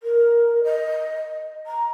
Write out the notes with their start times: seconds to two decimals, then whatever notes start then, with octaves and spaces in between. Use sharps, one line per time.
0.03 A#4
0.64 D#5
1.67 A#5